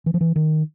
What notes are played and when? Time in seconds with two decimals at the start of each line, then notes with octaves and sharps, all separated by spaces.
0.06 E3
0.14 F3
0.21 E3
0.36 D#3